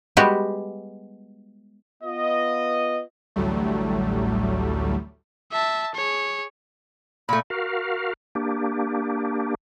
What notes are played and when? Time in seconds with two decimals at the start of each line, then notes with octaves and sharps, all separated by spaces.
0.17 G3 G#3 B3 F#4 G4
2.03 B3 F4 D#5
3.36 A1 D2 A2 F#3 G3 A3
5.52 E5 A5
5.95 G#4 C#5
7.29 A#2 A3 B5
7.50 F#4 A#4 F5
8.35 A#3 D4 G4